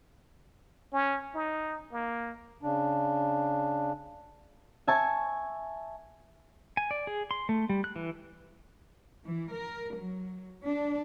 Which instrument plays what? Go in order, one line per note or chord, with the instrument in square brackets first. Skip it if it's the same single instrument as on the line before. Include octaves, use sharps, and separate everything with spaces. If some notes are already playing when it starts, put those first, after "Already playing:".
[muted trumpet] C#4
D#4
A#3
[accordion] C#3 D4
[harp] E5 G#5 A5 C#6 G#6
[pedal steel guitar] G#5
D5
G#4
C6
A3
G3
F#6
E3
[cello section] E3
A#4
F#3
D4